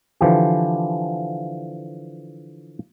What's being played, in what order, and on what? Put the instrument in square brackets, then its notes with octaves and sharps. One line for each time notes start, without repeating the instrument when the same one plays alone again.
[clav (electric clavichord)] D3 E3 F3 G4